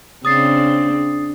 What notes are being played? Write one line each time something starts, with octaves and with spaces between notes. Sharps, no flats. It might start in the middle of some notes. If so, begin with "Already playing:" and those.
C#3 C4 D4 D#6 A6 C7